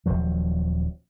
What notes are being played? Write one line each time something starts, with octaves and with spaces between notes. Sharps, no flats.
D#1 D#2 F3 F#3